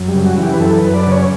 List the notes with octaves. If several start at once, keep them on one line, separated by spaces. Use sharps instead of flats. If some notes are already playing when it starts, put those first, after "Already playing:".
Already playing: F#2
G3
C#3
F#4
E3 G4
B4
F#2 A4
B4
F#2
D5
C#3 B4
C#5